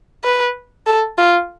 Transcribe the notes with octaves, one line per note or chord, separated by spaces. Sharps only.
B4
A4
F4